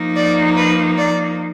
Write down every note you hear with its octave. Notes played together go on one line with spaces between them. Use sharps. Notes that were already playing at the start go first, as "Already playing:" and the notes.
Already playing: F3 A#3 D#4
D5
B4
D5